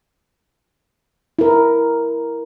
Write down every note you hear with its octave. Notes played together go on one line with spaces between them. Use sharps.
E4 A#4